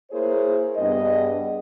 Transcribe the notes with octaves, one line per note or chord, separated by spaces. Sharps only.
A#3 E4 G#4 A#4 C5 C#5
G2 B3 G#4 D#5